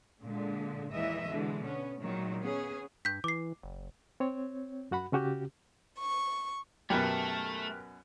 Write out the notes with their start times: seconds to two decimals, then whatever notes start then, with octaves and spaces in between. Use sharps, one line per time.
0.21 A#2 D3 G#3
0.92 D#2 A#2 E3 G#3 D#5 E5
1.28 B2 D3 E3 G#3
1.64 B3 C#4
2.01 A#2 D#3 F#3 G#3
2.40 B3 C#4 G#4
3.05 G2 G6 B6
3.24 E3 D6 C7
3.63 F#1
4.20 C4 C#5
4.91 F#2 F#4 F#5 B5
5.12 C#3 C#4 F#4 G4
5.99 C#6
6.90 F#2 B2 A3 G4 A#4 B4